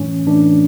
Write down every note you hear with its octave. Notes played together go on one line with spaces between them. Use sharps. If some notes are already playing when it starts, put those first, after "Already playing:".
Already playing: A2 E3 A3 C#4
A2 E3 A3 D4